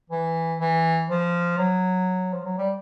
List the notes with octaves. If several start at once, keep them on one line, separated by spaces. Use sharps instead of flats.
E3
E3
F3
F#3
F3
F#3
G3